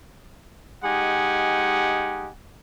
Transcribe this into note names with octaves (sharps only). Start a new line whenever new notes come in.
G#3 D#4 G4 F#5 G#5